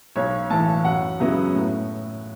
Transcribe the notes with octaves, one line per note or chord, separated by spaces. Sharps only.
B1 C#5
A2 E3 A5
F#2 F#5
C#3 F#3 B3 E4
A2